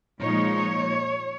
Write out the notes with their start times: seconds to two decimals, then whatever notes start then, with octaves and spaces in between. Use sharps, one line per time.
0.20 A#2 F3 G#3 D#4 C#5